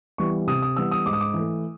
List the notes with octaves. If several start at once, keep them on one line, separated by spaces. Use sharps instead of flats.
E3 G3 B3 C#6
C3 D#6
D#6
E3 G3 B3 E6
D#6
G#2 D6
D#6
D6
E3
A3